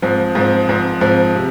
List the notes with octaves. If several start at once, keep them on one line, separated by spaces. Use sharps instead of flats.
G#2 F3 C4
G#2 F3 C4
G#2 F3 C4
G#2 F3 C4
C3